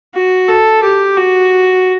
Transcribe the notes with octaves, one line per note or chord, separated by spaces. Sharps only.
F#4
A4
G4
F#4